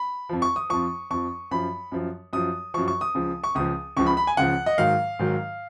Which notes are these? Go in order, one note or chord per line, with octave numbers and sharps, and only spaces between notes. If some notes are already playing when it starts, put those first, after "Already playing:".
Already playing: B5
F2 F3
C#6
D#6
F2 F3 C#6
F2 F3 C#6
F#2 F3 B5
F#2 F3
F#2 F3 D#6
F#2 F3 C#6
C#6
D#6
C#2 C#3 F3
C#6
C#2 C#3 F3 D#6
C#2 C#3 F3 C#6
B5
B5
G#5
C#2 C#3 F3 F#5
D#5
G#2 D#3 F#3 F5
G#2 D#3 F#3